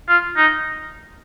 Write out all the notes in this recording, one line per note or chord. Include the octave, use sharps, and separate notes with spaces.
F4
D#4